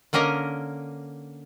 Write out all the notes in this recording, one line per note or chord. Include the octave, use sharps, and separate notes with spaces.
D3 A#3 C#4 A#4 D#5